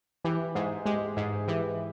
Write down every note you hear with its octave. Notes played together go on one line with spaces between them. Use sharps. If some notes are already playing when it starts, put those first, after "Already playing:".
E3 G4
G#2 G#4
G#3 G4
G#2 G#4
E3 G4